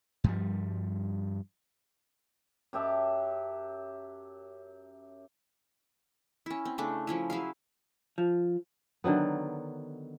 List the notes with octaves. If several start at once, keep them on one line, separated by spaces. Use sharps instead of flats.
G2 F3 G3
F#2 G4 E5 A5
C#4 E4
C4
C#3 A3 D4
F3 C#4 E4
F#3 E4 G#4 F5
F3
D3 D#3 F#3 B3